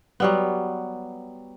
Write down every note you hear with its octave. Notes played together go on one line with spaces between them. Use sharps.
F#3 G3 B3